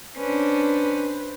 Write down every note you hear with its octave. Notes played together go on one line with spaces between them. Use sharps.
C#4 D4 B4 C5